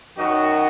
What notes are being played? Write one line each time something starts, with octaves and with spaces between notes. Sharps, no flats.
F#2 D#3 F#3 D#4 F#4